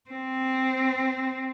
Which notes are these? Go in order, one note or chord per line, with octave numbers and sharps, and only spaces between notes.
C4